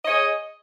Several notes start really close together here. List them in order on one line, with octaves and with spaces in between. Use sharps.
D#5 C#5 G#4